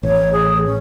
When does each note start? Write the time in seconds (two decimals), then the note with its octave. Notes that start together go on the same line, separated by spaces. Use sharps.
0.03 A1 C#5
0.32 G#4
0.66 C#4